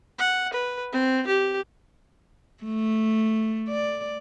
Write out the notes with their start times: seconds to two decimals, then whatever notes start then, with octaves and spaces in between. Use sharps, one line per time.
0.19 F#5
0.53 B4
0.92 C4
1.27 G4
2.64 A3
3.68 D5